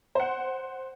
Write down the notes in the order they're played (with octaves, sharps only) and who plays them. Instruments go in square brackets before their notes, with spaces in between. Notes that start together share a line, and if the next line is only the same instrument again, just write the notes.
[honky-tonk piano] C5 F#5